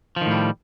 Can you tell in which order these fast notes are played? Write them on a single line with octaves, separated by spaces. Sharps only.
F3 D#3 A2 G3